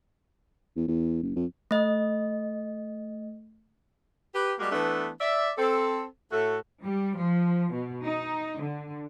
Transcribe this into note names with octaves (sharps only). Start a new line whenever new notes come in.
E2
E2
F#1
F2
A3 D#5
G4 B4
G3 G#3 A#3 F#4 G4
E3 A3 B3 D4
D5 E5
C4 A4
A2 A3 F#4 A4
G3
F3
B2
D#4
D3